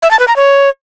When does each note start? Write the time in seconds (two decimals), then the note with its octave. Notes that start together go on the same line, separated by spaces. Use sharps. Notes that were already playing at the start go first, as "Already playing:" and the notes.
0.02 E5
0.11 A5
0.19 B4
0.28 A#5
0.36 C#5